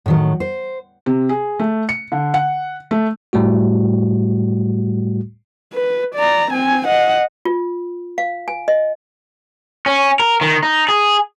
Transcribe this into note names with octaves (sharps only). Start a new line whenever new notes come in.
A2 D#3 F#3
C5
C3
G#4
A3
C#7
D3
F#5
A3
A2 G3 A3 F#4
B4
D5 A#5
C4 G#5
D#5 F#5
F4
F5
G#5
D#5
C#4
A#4
D#3
D#4
G#4